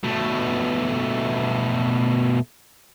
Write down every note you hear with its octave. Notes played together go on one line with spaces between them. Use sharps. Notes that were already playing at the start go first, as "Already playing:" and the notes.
B2 A3